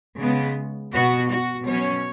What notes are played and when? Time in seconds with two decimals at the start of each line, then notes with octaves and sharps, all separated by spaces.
0.20 C#3 G#3 B3
0.93 B2 B3 F#4
1.29 F#4
1.66 B2 F#3 C#4 C#5